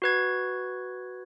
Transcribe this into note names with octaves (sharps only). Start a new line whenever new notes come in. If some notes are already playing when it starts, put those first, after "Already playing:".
F#4 B4 G#6